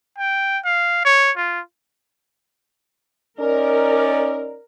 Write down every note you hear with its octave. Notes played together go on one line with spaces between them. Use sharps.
G5
F5
C#5
F4
C#4 D#4 A#4 D5